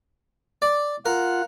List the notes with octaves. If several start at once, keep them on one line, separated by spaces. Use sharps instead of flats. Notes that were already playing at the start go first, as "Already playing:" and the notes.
D5
F4 A#4 F#5